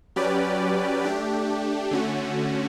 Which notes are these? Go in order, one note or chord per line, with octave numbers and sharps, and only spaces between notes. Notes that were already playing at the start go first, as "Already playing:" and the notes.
F#3 C#4 G4 B4 D5
A3 D4 G4
D3 A3 C#4 F#4